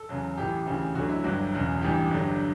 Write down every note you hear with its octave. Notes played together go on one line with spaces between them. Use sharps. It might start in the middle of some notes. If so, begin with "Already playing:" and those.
Already playing: A4
E2 C#3 F#3
A1 A2 E3 G4
D2 C#3 E3
D2 D3 F#3 F#4
E4
G1 G2 F#3 F#4
E1 E2 C#3
A1 G2 E3 G4
G1 G2 D3 F#3